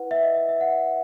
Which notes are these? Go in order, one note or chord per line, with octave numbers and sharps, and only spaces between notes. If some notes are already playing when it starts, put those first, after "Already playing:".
Already playing: E4 B4 F#5
E5
D#5
E5
E5
F#5